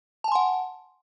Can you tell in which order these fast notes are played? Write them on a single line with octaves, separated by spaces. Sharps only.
A5 G#5 C6 F#5